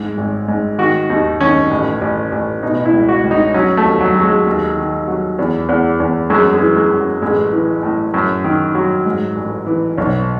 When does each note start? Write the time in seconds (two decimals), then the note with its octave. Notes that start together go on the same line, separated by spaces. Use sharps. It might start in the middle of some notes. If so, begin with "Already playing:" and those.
Already playing: G#2
0.18 G#1
0.48 G#2
0.78 D#3 F#4
1.10 D#2 D#4
1.40 D#3 C#4
1.71 A1
2.01 A1
2.32 A1
2.63 B2 D#4
2.85 E4
2.93 C#2
3.09 F#4
3.24 C#2
3.31 D#4
3.54 F#3 C#4
3.77 A3
3.85 D#2
4.01 F#3
4.15 F#3
4.23 G#3
4.46 D#2
4.77 D#3
5.08 F#3
5.39 E2
5.69 E2
6.00 E2
6.30 F#2 G#3
6.53 G#3
6.61 E3
6.76 G#3
6.91 F#2
6.99 F#3
7.22 A1 G#3
7.53 E3
7.83 A2
8.14 F#2
8.44 D#3
8.75 F#3
9.06 G#2
9.36 A1
9.67 E3
9.98 B1